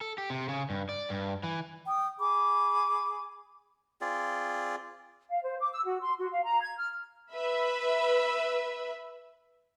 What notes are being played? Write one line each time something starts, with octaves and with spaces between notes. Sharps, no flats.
A4
G4
C3
C#3
G2
D5
G2
E3
G5 D#6
G#4 B5 D6
C4 F4 G#4 D5
F5
C5
D6
E6
F#4
C6
F#4
F5
A#5
G#6
F6
B4 E5 B5